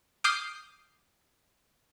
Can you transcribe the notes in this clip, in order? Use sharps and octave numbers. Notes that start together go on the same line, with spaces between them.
D6 D#6 F6 G6 C7